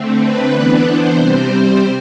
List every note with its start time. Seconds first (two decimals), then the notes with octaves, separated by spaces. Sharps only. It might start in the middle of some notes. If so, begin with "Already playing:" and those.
Already playing: D3 A3 C4
0.17 B4
0.48 E3 B3 D4
0.82 C5
1.14 C3 G3 C4